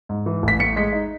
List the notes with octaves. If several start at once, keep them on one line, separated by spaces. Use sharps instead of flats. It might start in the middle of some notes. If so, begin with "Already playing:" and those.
G#2
E3
A1 B6
A2 C#7
G#3 B6
D#4